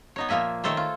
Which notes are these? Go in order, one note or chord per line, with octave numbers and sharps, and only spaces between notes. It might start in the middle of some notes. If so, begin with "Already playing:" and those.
B3 D#4 C#5
A#2 F3 A#3 E5 G#5
D#3 A3 A4 C5 C#5
F4